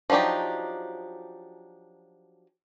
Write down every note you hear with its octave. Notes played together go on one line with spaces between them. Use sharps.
F3 F#3 D4 D#4 G4